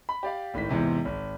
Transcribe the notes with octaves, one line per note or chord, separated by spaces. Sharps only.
B5
G4 D5 F5
G#1 A2 D#3 B6
E2 G#2 C3 E3
G#1